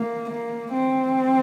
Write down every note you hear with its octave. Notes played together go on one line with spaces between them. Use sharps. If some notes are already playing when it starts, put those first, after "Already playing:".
Already playing: A#3
A#3
C4